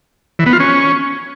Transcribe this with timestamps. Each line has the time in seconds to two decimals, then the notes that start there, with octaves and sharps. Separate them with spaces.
0.39 E3
0.46 B3
0.53 F4
0.60 C#4